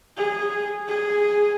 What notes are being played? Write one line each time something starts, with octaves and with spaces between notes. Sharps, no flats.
G#4
G#4